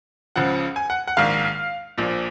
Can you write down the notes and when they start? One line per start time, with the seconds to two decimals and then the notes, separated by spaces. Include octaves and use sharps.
0.36 C#2 C#3 F3 F#5
0.76 G#5
0.90 F#5
1.07 F#5
1.17 A#1 G#2 D#3 F5
1.98 A#1 A#2 F3